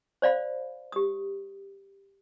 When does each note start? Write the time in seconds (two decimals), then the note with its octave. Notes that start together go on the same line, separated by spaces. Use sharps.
0.22 C5 D5 F5 B5
0.92 G4 D#6